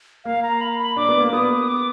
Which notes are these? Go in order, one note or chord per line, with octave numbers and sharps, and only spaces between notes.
A#3 F5
A#5
B5
B5
D4 D6
B3
A#3
B3 D#6
D6